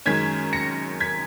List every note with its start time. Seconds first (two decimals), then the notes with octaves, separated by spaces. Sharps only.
0.05 F#2 D#3 G#3 C#4 G#6 B6
0.53 A#6 C#7
1.00 G#6 B6